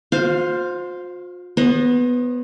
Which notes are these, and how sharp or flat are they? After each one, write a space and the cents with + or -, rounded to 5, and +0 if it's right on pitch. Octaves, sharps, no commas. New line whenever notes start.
F4 +40 C5 +0 F5 +0
B3 +0 C5 +40 D#5 +10